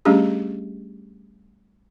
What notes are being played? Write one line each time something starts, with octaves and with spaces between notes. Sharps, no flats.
G3 A3 C#4 D4 G4 G#4